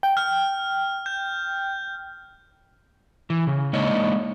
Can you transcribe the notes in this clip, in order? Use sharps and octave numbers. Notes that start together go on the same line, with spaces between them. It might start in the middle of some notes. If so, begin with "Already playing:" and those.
G5
F6
G6
E3
C#3
G#3 A#3 D4 D#4 C#5 D#5